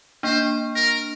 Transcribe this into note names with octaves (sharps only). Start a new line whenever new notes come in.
A#3 D4 C5
A#4